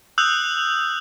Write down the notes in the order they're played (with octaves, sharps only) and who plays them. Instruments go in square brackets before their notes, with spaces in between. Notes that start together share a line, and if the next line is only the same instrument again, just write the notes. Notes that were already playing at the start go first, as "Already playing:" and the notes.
[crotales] D#6 E6 F#6 G6 F7 F#7